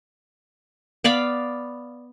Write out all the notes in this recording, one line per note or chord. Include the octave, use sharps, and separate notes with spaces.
B3 D5 F5 B5